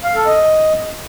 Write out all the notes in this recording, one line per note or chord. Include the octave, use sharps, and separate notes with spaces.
F5
A4
D#5